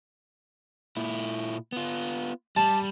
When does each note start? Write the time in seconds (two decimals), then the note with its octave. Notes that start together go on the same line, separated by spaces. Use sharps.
0.97 A#2 E4
1.72 B3 F4
2.56 G3 A5